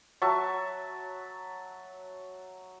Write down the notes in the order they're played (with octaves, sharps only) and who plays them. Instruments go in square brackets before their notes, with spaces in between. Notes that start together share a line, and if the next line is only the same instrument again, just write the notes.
[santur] F#3 E5 A5 C#6